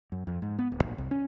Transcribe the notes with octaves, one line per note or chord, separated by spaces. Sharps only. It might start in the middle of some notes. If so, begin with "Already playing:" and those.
F#2
F2
G#2
B3
D1
A#1
C2
C#4